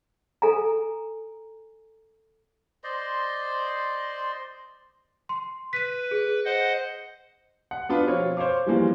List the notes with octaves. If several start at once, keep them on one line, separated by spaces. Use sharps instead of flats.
A4 G#5 A#5
C5 D5 D#5 C6
C6
B4 B6 D#7
G#4
C5 D#5 F#5
F#5
B3 D4 F4 B4
B2 F3 C4 F4 C#5
C5 C#5 F5 D6
E3 F3 G3 G#3 A#3 C4